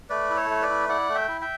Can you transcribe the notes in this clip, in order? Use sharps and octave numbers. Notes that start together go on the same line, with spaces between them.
A3 B4 D5
E4
A4 C#5
A3
B4 D5
E4
E4 D5 F#5
A3
E5 G5
E4
E5 G5